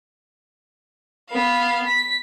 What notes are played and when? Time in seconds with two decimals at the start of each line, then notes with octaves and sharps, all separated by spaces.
1.31 B3 F5
1.87 B6